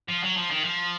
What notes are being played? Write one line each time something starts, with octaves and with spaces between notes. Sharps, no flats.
F3
F#3
F3
D#3
F3